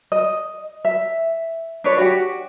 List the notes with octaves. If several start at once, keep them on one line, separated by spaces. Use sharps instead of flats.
D#5
E5
D4 B4 C#5
F#4 G4